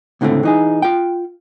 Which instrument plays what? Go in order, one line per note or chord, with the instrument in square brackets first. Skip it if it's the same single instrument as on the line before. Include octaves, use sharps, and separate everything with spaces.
[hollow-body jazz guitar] C#2 A2 D3 G3 A3 C4
E3 D#4 G#4
F4 G5